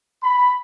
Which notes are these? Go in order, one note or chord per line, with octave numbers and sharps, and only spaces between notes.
B5